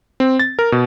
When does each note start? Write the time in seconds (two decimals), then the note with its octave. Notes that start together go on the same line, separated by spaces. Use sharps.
0.20 C4
0.39 A6
0.59 A#4
0.72 B2